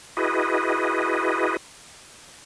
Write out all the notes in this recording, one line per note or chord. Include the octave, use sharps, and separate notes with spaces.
E4 F#4 G#4 B4 D#5